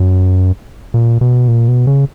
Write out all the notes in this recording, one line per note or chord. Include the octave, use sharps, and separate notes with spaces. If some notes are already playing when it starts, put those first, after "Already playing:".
Already playing: F#2
A#2
B2
A#2
B2
C#3